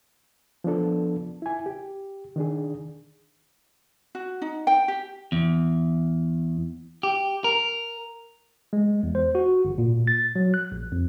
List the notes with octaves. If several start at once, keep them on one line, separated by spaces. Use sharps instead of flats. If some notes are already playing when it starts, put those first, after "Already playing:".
F3 B3 D4 A4
E4 G#5
G4
D#3 D4 G#4
F#4
D#4
G5
G4
E2
G4
A#4
G#3
E2
C5
F#4
G1
A#2
A6
F#3
F#6
A#1
F2